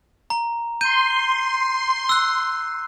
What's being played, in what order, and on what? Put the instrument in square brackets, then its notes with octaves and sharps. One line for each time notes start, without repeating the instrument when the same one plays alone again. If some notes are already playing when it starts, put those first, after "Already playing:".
[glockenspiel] A#5
[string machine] C6 [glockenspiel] G6 D#7
[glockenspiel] E6 F#6